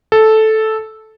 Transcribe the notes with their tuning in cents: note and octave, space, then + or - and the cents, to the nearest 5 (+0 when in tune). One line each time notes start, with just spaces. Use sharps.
A4 -10